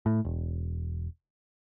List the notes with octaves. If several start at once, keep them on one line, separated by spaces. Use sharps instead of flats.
A2
E1